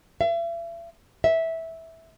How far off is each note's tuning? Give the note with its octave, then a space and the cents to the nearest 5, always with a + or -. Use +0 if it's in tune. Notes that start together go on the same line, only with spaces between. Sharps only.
E5 +40
E5 -10